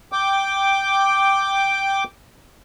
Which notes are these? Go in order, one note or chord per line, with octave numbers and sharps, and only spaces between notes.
G5 D6